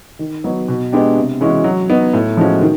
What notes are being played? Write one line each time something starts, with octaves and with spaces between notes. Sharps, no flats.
D#3
F#3 B3 D#4
B2
G#3 B3 D4 G4
C3
E3 G#3 C#4 F#4
F#3
B3 D#4
A2
F3 G#3 C#4 F#4
D#3